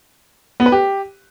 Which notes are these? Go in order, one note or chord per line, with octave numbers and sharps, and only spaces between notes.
B3
B4
G4